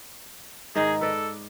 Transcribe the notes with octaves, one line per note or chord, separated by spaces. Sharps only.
G#2 D#3 D#4 G#4
A4 B4 D5 D#5